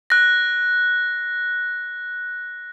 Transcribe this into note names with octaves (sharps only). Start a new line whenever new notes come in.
F#6 A#6